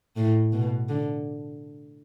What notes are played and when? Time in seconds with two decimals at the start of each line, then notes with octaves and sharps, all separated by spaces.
0.16 A2
0.52 B2
0.89 D3